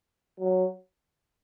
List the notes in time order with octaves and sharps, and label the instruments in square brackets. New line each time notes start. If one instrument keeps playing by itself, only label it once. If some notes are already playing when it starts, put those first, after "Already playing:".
[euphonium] F#3